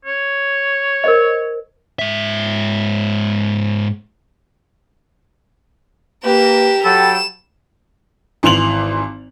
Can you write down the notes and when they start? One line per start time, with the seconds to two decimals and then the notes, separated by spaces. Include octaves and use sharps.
0.05 C#5
1.04 A#4 C5 D#5
1.99 G#2 E5
6.25 A#3 G4 A#4 B4 E7
6.85 F#3 A4 G5 B5 E7
8.43 G#1 E3 C6 F7 F#7